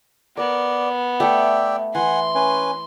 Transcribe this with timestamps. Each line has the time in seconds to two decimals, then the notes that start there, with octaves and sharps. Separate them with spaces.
0.37 B3 A#4 D5
1.20 A3 G4 D5 E5 G5
1.95 E3 F#5 G#5 C6
2.35 C#4 B4 G#5